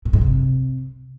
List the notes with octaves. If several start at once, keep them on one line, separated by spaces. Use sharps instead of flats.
A2
G#2
C3